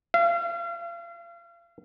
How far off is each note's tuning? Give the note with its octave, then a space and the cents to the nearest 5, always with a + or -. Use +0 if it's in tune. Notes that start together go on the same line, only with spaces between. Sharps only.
F5 -40